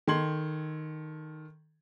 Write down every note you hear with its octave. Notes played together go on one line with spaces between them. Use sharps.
D#3 A4 C6 G#6 F#7